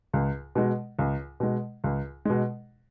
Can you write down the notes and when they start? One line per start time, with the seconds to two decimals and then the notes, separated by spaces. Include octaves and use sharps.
0.13 C#2
0.55 B2 G#3
0.99 C#2
1.40 B2 G#3
1.84 C#2
2.25 B2 G#3